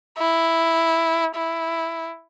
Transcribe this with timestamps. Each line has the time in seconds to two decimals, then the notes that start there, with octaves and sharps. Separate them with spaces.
0.18 E4
1.36 E4